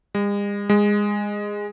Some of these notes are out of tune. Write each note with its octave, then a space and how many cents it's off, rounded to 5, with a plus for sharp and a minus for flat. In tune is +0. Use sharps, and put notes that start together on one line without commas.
G#3 -45
G#3 -15